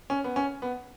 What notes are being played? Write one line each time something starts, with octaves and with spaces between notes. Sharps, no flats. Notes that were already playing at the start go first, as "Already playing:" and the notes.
C#4
B3
C#4
B3